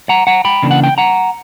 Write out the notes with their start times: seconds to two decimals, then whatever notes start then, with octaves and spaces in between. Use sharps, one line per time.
0.09 F#5 A#5
0.27 F#5 A#5
0.45 G5 B5
0.63 C#3 E3 A#3 D4
0.71 F#5
0.83 G5
0.98 F#5 A#5